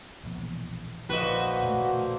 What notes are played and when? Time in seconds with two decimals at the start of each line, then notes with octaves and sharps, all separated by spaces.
0.23 E1 A#1 E2
1.09 A#1 D3 A#3 F#4 B4 C5 D#5 B5
1.62 E1 A#2 A3